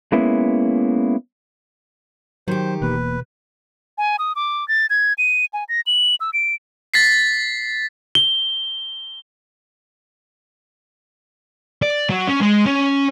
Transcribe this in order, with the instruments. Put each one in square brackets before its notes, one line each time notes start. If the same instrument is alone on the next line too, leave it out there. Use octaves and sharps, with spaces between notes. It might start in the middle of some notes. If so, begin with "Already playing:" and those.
[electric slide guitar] G#3 A#3 B3 C#4 E4
[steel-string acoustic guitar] D#3 G4 [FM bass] F#3 [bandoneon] C5
[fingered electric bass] E1 E2 A#3 [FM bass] B2 [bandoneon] B4
[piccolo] G#5
D#6
D6
A6
G#6
D#7
G#5
A#6
F#7
E6
D7
[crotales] A6 B6 C7
[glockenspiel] G7
[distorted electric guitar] D5
F#3
C#4
G#3
C#4